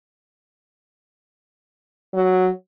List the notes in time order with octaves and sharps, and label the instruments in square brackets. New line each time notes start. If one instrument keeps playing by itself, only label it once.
[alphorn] F#3